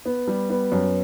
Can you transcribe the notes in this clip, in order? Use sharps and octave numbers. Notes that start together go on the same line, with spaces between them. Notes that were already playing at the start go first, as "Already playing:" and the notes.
B3
G3
B3
F#2